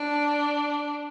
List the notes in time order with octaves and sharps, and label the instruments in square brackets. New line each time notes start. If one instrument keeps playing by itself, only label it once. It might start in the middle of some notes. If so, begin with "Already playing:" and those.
Already playing: [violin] D4